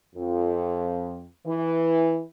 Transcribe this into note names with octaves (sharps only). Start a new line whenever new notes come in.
F2
E3